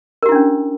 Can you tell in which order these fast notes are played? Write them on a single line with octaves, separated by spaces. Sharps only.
A#4 G4 E4 D4 C#4